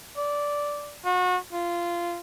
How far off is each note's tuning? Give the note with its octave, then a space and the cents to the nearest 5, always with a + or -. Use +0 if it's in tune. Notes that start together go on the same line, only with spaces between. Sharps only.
D5 -10
F#4 -30
F4 -15